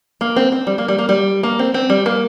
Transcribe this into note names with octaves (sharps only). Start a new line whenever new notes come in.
A#3
C4
C4
G3
A#3
G3
A#3
G3
A#3
C4
C4
G3
A#3